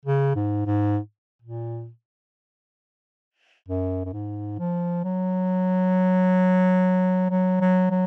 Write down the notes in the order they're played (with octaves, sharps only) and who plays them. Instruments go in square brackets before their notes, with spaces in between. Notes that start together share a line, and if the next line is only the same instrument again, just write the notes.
[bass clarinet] C#3
G#2
G#2
A#2
F#2
F#2
G#2
F3
F#3
F#3
F#3
F#3